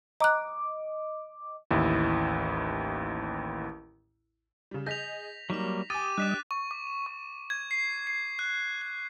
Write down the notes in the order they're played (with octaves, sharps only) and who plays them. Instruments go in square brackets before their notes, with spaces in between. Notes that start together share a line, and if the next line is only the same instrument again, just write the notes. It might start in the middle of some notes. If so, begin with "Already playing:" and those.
[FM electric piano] D#5 D6 [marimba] A#5 F#6
[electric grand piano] A1 D#2 E4
[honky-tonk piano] C#3 G3
[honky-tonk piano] G#4 D#5 G6 [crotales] A#6 B6 F7
[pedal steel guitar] F#3 G3 A#3 [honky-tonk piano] D#4 E7 [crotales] B6
[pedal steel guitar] G4 [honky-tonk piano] G#5 D#6 [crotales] D6 A6 D#7
[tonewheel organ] G3 D#5 [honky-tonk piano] D4 [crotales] F#6 B6 E7
[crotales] C#6
D6
E7
C#6
G#6
C7
C7
F#6
F#6